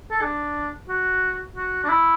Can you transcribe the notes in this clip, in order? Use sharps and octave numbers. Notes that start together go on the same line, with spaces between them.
A4
D4
F#4
F#4
D4
E4